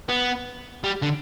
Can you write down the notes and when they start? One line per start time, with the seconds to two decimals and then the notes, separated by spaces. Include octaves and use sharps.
0.09 B3
0.84 G3
1.02 D3